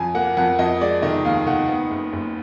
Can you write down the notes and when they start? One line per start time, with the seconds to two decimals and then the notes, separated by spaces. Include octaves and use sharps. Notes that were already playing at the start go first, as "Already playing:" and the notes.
Already playing: F2 G#5
0.15 A#3 F#5
0.37 F2 F#5
0.59 F2 D#5
0.81 G#3 D5
1.02 D#3 D#5
1.25 D#2 F5
1.47 D#3 F#5
1.68 B3
1.91 F#1
2.13 F#1